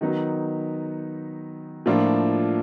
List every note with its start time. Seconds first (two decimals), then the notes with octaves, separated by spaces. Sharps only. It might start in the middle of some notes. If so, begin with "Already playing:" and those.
0.01 D#3 F#3 B3 D#4
1.86 A2 F3 A#3 D4 F4